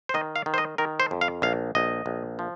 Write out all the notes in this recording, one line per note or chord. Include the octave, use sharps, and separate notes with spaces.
C5
D#3 D#5
F5
D#3
C5
D#5
D#3 A#4
C5
F2
F5
A#1 F5
A#1 D#5
A#1
F3